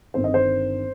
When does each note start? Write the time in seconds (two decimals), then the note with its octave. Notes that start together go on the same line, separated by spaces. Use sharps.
0.14 G1 G2 D#3 C4 C5
0.24 D#5
0.34 C5